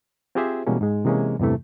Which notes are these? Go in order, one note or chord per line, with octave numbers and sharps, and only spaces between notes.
C4 F4 G4 G#4 C5 E5
B2 E3 G3 G#3 A#3 C#4
G#2 G#3
C3 E3 G#3 A#3 C#4
E2 G2 C3 E3 A3